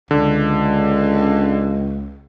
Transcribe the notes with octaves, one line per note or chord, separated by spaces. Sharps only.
C#2 D3